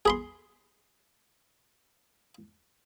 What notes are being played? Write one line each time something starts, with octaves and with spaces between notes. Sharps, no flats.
G#4 B5 C6